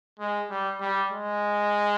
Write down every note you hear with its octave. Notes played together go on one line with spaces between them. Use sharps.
G#3
G3
G3
G#3